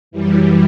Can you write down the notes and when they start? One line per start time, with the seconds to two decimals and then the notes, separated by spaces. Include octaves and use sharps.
0.11 F#2 E3 G3